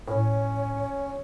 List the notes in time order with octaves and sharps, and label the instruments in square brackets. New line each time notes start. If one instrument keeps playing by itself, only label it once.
[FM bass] A2 [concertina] C#4 [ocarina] C#5